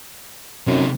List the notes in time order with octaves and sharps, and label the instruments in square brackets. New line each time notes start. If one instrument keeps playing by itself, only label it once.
[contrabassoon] F#2 [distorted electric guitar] C3 D#4